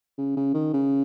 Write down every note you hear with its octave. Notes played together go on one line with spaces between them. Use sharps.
C#3
C#3
D#3
C#3